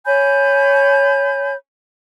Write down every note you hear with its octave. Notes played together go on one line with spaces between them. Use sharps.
C#5 G#5 B5 G6